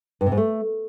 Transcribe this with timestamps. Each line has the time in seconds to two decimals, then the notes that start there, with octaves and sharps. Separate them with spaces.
0.21 G2
0.26 C3
0.32 G#2
0.37 A3